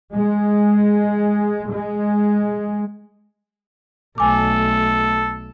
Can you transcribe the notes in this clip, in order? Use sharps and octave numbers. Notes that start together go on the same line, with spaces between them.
G#3
G#3
B1 A3 A4 G#5 D6